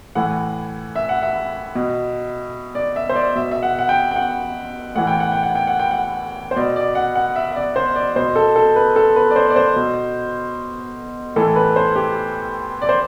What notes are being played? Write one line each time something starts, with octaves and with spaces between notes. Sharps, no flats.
A2 E3 F#5
E5
F#5
E5
B2
D5
E5
C5
D5
B2 E5
E5
F#5
F#5
G5
G5
F#5
A2 E3 F#5
G5
F#5
G5
F#5
G5
F#5
G5
F#5
C5
B2 D5
D5
F#5
F#5
E5
E5
D5
C5
D5
B2 C5
A4
A4
B4
A4
B4
D5
C5
D5
C5
B2
A2 E3 A4
B4
C5
G4
D5
C5